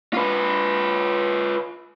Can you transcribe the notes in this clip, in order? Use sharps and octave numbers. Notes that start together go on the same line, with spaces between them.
F4 B4